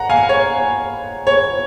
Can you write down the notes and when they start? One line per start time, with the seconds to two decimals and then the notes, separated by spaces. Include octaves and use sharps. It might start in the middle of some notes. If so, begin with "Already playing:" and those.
Already playing: F#5 A#5
0.09 F5 G#5
0.29 C#5
1.27 C#5